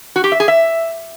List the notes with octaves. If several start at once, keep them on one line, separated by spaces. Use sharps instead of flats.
F#4
G4
E5
G#4
E5